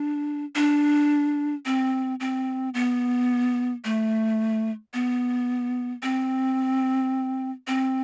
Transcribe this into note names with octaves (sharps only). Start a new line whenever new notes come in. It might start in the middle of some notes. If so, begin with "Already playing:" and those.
Already playing: D4
D4
C4
C4
B3
A3
B3
C4
C4